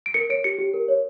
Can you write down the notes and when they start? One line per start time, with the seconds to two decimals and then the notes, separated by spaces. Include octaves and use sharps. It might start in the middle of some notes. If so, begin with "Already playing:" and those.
0.06 D7
0.14 A#4 C#7
0.30 C#5 D7
0.44 G4 C#7
0.58 G4
0.74 A#4
0.88 C#5